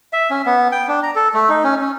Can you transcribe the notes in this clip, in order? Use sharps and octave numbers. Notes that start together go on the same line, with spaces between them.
E5
C#4
B3
G5
D4
A#5
A4
A3
D#4
C#4
C#4